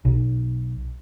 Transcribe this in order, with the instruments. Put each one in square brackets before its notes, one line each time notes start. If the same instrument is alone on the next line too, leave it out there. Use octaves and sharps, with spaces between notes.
[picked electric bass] B1